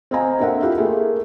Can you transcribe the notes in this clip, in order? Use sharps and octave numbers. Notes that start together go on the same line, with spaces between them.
C4 D#5 F5 G#5 A#5
A#3 D4 A4 A#4 E5 F#5
E4 F4 G4 E5 F5
A3 A#3 G#4